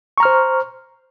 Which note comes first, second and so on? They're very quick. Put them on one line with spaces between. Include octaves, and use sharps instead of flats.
C#6 A#5 F6 C5